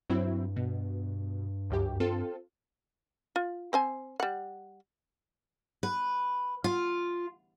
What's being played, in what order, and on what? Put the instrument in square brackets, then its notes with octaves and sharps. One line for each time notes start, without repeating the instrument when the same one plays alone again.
[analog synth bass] G2 [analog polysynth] F#3 C4 E4
[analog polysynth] B2
C#2 F#2 G4
C4 F4 A4
[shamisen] F4
C4 C5 G#5
G3 F#5
[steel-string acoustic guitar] B4
F4